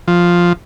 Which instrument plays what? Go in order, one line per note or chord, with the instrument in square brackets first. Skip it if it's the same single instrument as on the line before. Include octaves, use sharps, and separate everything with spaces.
[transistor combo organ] F3